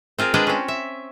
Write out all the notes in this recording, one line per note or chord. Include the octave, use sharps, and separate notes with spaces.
C4 F4 G#4 A#4
G#3 D4 G#4 B4 D5 G5
C4 C#4
E5